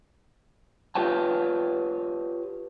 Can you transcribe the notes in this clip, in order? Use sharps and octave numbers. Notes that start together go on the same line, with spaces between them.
F4 G4 B4 C#5 G5 A5